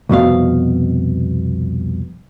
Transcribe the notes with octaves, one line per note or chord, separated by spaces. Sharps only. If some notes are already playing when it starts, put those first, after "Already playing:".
C2 F2 B2 F5